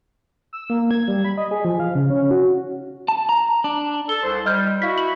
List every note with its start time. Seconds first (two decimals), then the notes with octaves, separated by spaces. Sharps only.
0.53 E6
0.70 A#3
0.91 G#6
1.08 G3
1.24 B5
1.38 D#5
1.51 G#4
1.65 F3
1.80 F5
1.95 C#3
2.10 C#4
2.31 F#4
3.08 A5
3.29 A#5
3.64 D4
4.09 A4 G7
4.24 C2 C5 C6
4.46 G3 D#5 F6 G6
4.82 E4 F#4 F5 B6
4.98 F#7